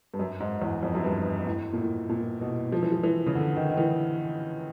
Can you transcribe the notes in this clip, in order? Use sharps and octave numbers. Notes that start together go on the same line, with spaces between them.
G2
F#2
G#2
E2
F2
F#2
G2
A2
A#2
A2
A#2
B2
F3
E3
F3
E3
C#3
D3
D#3
D#3
E3